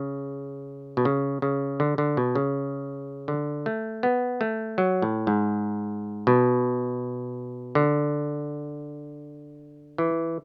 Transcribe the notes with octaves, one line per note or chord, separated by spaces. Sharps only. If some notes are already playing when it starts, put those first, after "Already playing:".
Already playing: C#3
B2
C#3
C#3
D3
D3
B2
C#3
D3
A3
B3
A3
F#3
A2
G#2
B2
D3
E3